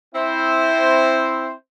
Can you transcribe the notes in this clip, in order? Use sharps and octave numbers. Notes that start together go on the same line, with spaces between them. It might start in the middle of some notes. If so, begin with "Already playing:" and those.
C4 E4 C5